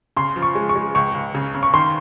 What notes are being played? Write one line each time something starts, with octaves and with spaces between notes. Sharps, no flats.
C#3 C6
F3
C#6
G#3
C#6
G#3
C#2 C#6
C#2
C#3
C#3
C#6
D#3 C6